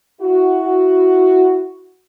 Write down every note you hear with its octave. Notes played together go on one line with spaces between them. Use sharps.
E4 F#4